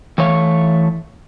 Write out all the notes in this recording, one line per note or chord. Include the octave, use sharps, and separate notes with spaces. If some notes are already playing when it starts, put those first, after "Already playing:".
E3 A3 C#5 F5